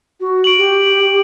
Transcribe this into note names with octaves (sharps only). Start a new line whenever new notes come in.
F#4
D7 F#7
G4